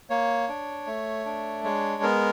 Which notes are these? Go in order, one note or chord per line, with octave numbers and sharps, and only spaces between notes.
A#3 C#5
D4
A3
D4
G#3 C#5
B3 A#4